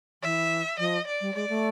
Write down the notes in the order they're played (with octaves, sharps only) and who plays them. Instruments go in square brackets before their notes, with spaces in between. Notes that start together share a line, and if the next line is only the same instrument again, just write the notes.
[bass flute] E3 [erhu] E5
[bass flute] F3 [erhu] D#5
[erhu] D5
[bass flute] G3
[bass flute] G#3 [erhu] D5
[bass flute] A3